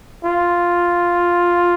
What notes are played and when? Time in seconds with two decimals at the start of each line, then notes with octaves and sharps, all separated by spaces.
0.25 F4